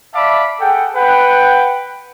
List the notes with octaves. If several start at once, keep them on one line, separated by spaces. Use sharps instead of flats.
D5 E5 F5 A5 B5 D6
G#4 A4 F#5 G5
B4 F#5 G5